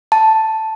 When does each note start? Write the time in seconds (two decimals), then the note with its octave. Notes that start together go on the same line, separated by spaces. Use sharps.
0.12 A5